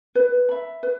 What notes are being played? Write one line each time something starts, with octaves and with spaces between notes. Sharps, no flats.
B4
E5 B5
B4